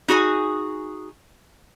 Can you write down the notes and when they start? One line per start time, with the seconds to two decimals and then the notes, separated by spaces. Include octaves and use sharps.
0.08 D#4 F#4 G#4 G#5